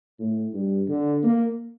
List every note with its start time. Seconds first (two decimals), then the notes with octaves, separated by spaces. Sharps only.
0.19 A2
0.53 G2
0.89 D3
1.23 A#3